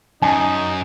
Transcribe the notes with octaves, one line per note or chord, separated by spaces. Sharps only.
F#2 D#4 G#5